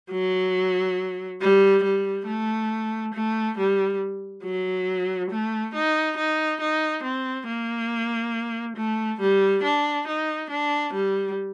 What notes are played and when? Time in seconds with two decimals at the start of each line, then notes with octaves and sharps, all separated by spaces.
0.11 F#3
1.41 G3
1.84 G3
2.27 A3
3.14 A3
3.58 G3
4.44 F#3
5.30 A3
5.74 D#4
6.17 D#4
6.61 D#4
7.03 C4
7.47 A#3
8.76 A3
9.20 G3
9.63 D4
10.07 D#4
10.50 D4
10.93 G3